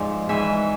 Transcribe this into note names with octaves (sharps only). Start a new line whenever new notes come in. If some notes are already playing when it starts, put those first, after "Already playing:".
Already playing: G#2 F3 D5 E5 G#5
G#2 E3 E5 G#5